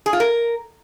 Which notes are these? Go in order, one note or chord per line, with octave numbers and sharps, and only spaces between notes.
G#4
F4
A#4